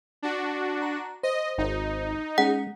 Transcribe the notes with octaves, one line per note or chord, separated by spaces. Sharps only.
D4 F#4
A#5
C5 D#5
G#1 D#4
G#3 C#4 G#4 F#5